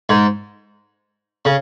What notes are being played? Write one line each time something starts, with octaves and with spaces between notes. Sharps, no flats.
G#2
C#3